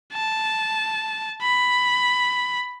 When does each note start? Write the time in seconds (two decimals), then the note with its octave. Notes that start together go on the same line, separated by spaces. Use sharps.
0.13 A5
1.42 B5